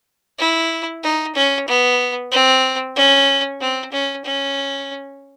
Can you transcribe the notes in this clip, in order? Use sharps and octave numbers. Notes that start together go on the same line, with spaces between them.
E4
D#4
C#4
B3
C4
C#4
C4
C#4
C#4